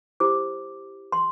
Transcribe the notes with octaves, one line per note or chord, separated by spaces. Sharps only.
E4 G4 C5 D6
C6